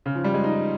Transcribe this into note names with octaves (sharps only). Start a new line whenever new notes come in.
C#3
F3
G3
G#3
D#4